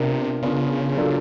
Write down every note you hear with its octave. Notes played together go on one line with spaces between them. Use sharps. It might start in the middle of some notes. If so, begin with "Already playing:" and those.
Already playing: C3 B3 D4 F4 A#4
C#3 B3 D4 F4 A#4
F#3 A#3 D4 F4 A4